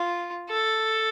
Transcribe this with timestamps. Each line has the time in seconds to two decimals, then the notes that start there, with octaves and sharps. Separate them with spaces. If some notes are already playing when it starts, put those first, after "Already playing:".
Already playing: F4
0.49 A4